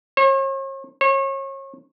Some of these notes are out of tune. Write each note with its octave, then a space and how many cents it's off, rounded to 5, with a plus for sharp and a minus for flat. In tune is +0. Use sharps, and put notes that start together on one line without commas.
C#5 -45
C#5 -35